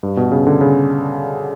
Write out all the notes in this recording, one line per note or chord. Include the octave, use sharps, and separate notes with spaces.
G2
B2
C#3
D3
C#3